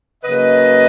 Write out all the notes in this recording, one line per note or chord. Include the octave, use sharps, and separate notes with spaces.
C#3 F#3 A#3 B4 D#5